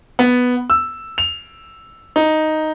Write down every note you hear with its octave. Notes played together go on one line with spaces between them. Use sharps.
B3
E6
F7
D#4